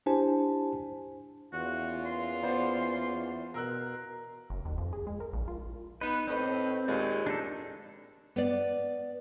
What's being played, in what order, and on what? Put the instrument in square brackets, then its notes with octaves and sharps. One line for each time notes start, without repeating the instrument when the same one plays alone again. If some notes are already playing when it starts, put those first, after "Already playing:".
[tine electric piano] D4 E4 G4 C5 G#5 A5
[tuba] E2 [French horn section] A#2 C#4 F4 [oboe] F#4
[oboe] C6
[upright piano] B3 C5 D5
[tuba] B2 [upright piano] A#4 E6 F#6
[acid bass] F#1
D#2
F2
G#4
G#3
A#4
A#1
F4
[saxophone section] B3 D#4 [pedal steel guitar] B4
[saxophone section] A2 B4 D#5 [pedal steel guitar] C4
[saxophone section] D#2 A#2 G#3
[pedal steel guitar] D4 D#4 A4
[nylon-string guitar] B3 D5